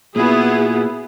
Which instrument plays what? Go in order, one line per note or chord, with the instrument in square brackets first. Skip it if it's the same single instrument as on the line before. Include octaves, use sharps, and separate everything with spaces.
[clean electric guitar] A#2 F#4 [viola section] B3 E4 G#4